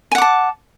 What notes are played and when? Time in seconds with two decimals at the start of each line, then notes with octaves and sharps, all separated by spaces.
0.12 G#5
0.15 F#5
0.18 D6
0.22 A5